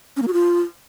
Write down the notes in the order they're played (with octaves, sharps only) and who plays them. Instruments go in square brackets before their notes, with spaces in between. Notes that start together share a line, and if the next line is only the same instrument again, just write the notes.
[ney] C#4
A#3
F#4
F4